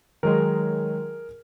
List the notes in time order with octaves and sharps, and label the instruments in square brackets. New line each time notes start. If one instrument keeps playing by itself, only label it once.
[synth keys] D#3 F#3 G#3 [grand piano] G#4 A#4